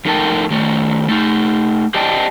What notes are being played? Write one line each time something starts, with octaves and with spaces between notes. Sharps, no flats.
F2 A3 D#4 A#4 G5 A5
D#3 A3 C#5
A3 D#4
G4 C5 D5 D#5 G5 A5